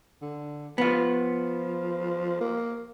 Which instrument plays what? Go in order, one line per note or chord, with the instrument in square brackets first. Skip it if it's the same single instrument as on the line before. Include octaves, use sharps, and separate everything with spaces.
[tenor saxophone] D3
[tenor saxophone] F3 [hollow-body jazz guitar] B3 F4
[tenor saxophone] A#3